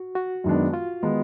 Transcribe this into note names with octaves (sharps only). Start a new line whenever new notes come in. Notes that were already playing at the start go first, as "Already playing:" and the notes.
Already playing: F#4
F#4
F#2 D#3 G#3 B3 D4
F4
D#3 G#3 B3 D#4